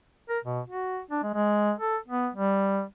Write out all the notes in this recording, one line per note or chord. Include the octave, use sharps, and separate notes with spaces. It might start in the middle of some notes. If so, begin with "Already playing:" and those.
A#4
B2
F#4
D4
G#3
G#3
A4
B3
G3